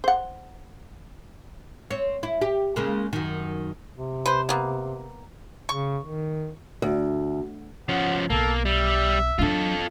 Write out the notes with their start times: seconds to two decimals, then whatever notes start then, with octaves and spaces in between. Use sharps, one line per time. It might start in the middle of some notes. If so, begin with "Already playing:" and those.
0.04 C5 F#5
1.91 C4 C#5
2.23 E4
2.41 G4
2.76 C#3 G#3 A#3
3.13 F#2 D#3
3.96 C3
4.26 B4 C5
4.49 A#3 B3
5.69 C#3 C#6
6.04 D#3
6.82 D2
7.89 F3 C#4 F#5
8.30 B1 A#3 A4
8.65 G3 E5
9.39 F#3 D4 F4 A4